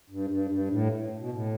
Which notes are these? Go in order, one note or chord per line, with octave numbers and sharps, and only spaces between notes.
G2
G2
G2
A2
B2
A2